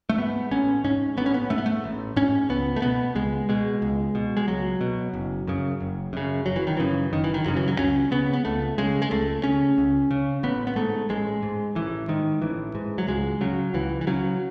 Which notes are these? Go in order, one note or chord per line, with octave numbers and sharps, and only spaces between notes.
A3
G#2 B3
A1 C#4
G#2 C#4
A1 B3
C#4
B3
G#2 A3
B3
A3
A1
G#2 C#4
C#2 B3
A3
B2 B3
C#2 G#3
B2 G#3
C#2
B2
G#3
C#2 F#3
B2
F#1
F#2 C#3
F#1
F#2 C#3
F#1 F#3
E3
D#3
F#2 C#3 E3
F#1 D#3
E3
D#3
F#2 C#3 F#3
E3
F#3
C#2 C#4
C#3 B3
B3
C#2 A3
C#3 G#3
G#3
C#2 A3
C#3 C#4
C#2
C#3
A1 B3
B3
G#2 A3
A1 G#3
G#2
A1 E3
G#2 D#3
A1 E3
G#2
F#3
C#2 G#3
C#3 F#3
C#2 E3
E3
C#3 F#3